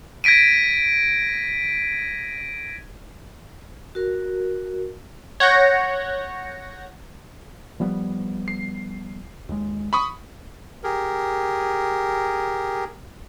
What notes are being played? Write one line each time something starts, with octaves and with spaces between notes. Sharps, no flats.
G#6 A#6 B6 D7 D#7
F#4 A#4
C#5 F#5 G6 A#6
F3 G3 B3
C7
D#2 G#3
B5 C#6 D#6
G4 G#4 A#4